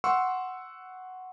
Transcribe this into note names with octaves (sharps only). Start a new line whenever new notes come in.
F#5 C6 C#6 E6